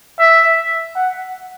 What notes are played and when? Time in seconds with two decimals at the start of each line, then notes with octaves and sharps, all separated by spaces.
0.19 E5
0.95 F#5